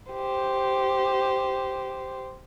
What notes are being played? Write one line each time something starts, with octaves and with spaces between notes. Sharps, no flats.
G4 C5